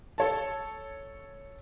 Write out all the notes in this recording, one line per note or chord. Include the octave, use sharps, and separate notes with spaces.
A4 C#5 A5